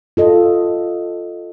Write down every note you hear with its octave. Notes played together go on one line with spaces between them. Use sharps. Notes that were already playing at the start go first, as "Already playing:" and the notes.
F4 A4 D#5